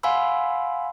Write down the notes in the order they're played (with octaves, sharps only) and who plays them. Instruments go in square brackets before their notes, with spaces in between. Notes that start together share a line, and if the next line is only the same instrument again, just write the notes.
[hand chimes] F5 F#5 G#5 B5 C6 E6